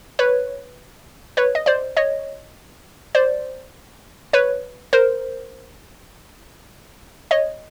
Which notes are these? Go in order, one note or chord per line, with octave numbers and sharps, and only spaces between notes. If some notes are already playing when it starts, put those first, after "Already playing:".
B4 C#5
B4 C#5
D#5
C5 D5
C#5 D#5
C5 D5
B4 C#5
A#4 C5
C#5 D#5